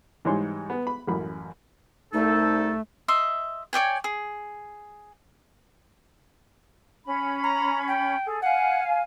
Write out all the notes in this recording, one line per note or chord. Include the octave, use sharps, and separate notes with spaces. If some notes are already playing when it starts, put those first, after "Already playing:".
G#2 E3 G3 G#3 C#5 C6
B3
B5
A1 F#2 B5
C2 A3 D#4 A4
D#5 E5 C6
C#5 D5 G5 G#5
G#4
C#4 B5
A#5
G5
G#4 A4
F5 F#5 G#5